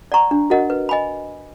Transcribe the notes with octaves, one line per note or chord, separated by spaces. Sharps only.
D5 F#5 A#5 C#6
D4
F#4 A#4 D#5 F#5
B4
D#5 G#5 B5